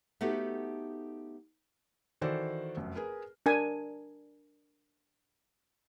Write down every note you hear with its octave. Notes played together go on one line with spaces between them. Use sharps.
A3 B3 D#4 F#4 G4 A4
D#3 E3 F#4 A4 C5 D5
F1 F#2
G#4 A#4 B4
D4 A#4 G#5